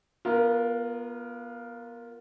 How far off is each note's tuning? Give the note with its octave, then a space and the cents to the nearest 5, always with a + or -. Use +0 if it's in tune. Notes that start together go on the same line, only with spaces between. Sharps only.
B3 -30 F4 +0 A#4 +0